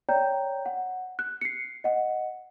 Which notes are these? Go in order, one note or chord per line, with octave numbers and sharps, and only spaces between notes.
C#5 D5 G5 A#5 G6
F#5
F#6
C7 C#7
D#5 F#5